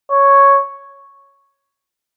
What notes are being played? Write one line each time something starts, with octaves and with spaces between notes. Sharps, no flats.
C#5